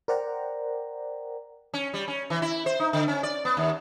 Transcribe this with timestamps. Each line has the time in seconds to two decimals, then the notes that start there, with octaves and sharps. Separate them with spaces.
0.08 A#4 C5 D5 F#5 G5 A#5
1.74 C#4
1.94 G3
2.08 C#4
2.30 E3
2.42 E4
2.66 C5
2.80 D#4
2.93 D3
3.08 C#4
3.23 D5
3.45 B3
3.57 D#2